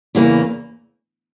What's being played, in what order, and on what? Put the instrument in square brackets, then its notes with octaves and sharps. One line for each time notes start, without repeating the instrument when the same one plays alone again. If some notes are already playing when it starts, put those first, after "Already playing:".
[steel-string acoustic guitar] E2 C#3 E3 A#3